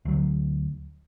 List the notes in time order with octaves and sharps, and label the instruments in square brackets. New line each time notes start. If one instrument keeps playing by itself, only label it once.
[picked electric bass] D2 F#3